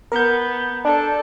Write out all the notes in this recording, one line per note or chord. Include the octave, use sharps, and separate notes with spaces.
B3 A#4 G6
D4 A4